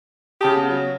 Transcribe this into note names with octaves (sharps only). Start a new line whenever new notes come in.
C#3 G4 A5 D#6
B3
F#3